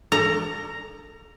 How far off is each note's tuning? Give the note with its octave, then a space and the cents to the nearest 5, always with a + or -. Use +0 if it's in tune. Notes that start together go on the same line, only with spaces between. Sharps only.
A4 +45 A#5 +0